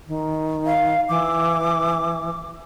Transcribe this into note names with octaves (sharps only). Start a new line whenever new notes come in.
D#3
F5
E3 D6